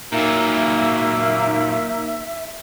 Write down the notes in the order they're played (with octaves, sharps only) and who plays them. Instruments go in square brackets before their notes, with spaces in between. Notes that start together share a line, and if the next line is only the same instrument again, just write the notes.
[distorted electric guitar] A#2 F#3 [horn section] A#3 [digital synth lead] D#4 [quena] E5